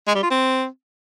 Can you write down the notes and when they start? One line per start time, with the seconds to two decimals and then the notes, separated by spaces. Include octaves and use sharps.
0.07 G#3
0.15 G3
0.23 F4
0.31 C4